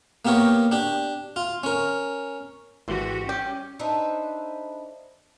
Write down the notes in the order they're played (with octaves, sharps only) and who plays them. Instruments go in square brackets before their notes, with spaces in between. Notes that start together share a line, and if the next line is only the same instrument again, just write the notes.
[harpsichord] A#3 B3 G4 A#4 C#5
D4 G4
F4
C#4 A#4
[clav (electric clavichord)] G#1 E3 C5 [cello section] F#4 G4
[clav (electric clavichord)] G3 G5 [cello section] C#4 [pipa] G4
[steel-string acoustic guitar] D4 D#4 A4 B4 C5 E5